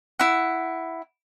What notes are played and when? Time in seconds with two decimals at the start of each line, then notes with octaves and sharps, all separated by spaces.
0.19 E4 F#5